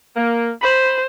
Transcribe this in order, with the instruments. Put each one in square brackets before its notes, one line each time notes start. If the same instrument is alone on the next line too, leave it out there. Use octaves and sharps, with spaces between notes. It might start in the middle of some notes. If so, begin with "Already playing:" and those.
[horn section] A#3
[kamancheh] C5 [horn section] B5